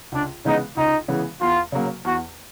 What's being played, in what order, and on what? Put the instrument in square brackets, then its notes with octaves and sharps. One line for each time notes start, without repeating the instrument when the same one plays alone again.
[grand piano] C#2 [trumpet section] D4
[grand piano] C#3 E3 G#3 B3 [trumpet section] D#4
[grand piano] C#2 [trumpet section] D#4
[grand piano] C#3 E3 G#3 B3
[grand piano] E2 [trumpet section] F4
[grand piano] C#3 F#3 A#3
[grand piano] E2 [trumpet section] F#4